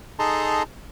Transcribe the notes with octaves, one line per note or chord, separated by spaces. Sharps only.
D#4 G#4 A4 A5 A#5 C6